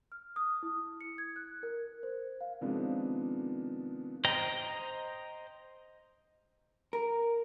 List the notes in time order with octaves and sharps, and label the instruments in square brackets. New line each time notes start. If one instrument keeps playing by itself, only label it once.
[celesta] F6
D#6
E4
C#7
G#6
F#6
A#4
C5
F5
[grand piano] C3 D#3 F3 G#3 B3 D4
[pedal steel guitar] C5 D#5 G5 A#5
[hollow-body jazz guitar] A#4